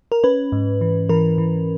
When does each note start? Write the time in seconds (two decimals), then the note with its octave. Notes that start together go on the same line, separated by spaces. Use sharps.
0.12 A#4
0.24 C#4 B4
0.52 G#2
0.81 E3
1.09 E3 A#4
1.38 E3